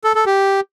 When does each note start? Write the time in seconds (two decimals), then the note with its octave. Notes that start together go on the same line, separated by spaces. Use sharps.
0.04 A4
0.15 A4
0.26 G4